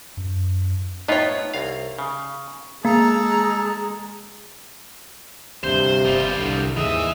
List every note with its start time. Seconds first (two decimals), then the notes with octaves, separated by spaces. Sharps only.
0.17 F#2
1.08 A2 B3 D#4 F4 C#5
1.54 C2 F5
1.99 C#3
2.85 G#3 A#3 G#4 A4 A#5
5.64 D2 G2 C3 C5 G6
6.05 G1 G3 F4
6.38 C2 D3
6.77 D#2 G#2 E3 G#3 E5 D#6